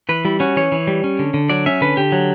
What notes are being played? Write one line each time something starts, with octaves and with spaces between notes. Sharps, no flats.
E3 B4
G3 E4
C#4 F#4
E3 C#5
E3
G3
C#4
D3
D3
F#3 D5
C#4 E5
D3 B4
D3 G4
F#3